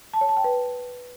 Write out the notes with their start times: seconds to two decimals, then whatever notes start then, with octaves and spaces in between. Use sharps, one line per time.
0.14 A5
0.21 C#5
0.29 A5
0.37 G5
0.44 B4